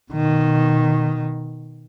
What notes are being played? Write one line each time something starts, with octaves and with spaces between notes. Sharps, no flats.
B2 D#3